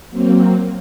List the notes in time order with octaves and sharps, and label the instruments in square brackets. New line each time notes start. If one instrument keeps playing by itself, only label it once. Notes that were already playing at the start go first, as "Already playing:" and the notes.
[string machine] F#3 A#3 C4